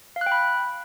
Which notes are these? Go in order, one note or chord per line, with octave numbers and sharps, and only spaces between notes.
F5
F#6
G5
B5